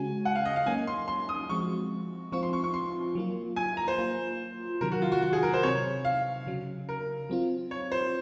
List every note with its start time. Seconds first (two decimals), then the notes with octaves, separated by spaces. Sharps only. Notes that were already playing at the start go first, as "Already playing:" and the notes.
Already playing: C#3 G#3 C#4 F#4 G#5
0.25 F#5
0.36 F5
0.45 D#5
0.56 F5
0.66 F#3 A#3 C#4 G#5
0.87 C6
1.08 C6
1.29 D#6
1.49 F3 G#3 C4 F#4 C#6
2.32 F3 C4 F4 C#6
2.43 C6
2.53 C#6
2.64 C#6
2.74 C6
3.15 F#3 A#3 F4
3.56 G#5
3.77 A#5
3.88 C5
3.98 F#3 A#3 F4
4.81 C3 D#3 F#3 A#4
4.92 F#4
5.02 F4
5.12 F#4
5.22 F#4
5.33 G#4
5.43 A#4
5.54 C5
5.63 C3 F#3 C4 C#5
6.05 F5
6.47 C#3 F#3 C#4
6.89 A#4
7.30 F#3 C4 F4
7.71 C#5
7.92 C5